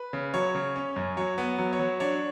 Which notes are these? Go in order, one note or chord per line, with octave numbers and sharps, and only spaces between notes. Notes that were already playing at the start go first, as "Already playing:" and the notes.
Already playing: B4
C#3
F#3 C#5
C#3
C#4
F#2
F#3 C#5
B3
F#3
C#5
F#3
D4 C#5